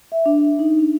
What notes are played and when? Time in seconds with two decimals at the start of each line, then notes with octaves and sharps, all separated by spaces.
0.12 E5
0.26 D4
0.59 D#4
0.79 D4